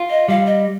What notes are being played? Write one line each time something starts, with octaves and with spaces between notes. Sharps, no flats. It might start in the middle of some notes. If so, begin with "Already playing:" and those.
Already playing: F4
D#5
G3 F5
D#5